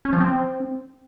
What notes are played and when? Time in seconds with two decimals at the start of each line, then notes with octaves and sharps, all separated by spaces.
0.05 C#4
0.13 F3
0.20 C4